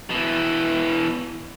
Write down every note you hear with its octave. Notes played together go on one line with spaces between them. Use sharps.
B2 E3